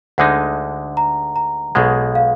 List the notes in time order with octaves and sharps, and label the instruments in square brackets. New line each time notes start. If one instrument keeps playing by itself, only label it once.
[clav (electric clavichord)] D2 D3 G#3 D#4 [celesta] F#5
[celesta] A#5
A#5
[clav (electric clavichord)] B1 B2 G#3 [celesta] F#5
[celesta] F5